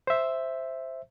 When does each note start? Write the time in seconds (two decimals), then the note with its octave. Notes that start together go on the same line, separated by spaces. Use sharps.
0.07 C5 E5